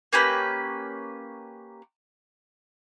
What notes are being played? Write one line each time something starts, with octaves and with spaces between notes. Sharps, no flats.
A#3 C#4 G4 B4